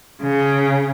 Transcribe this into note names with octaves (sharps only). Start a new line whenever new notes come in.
C#3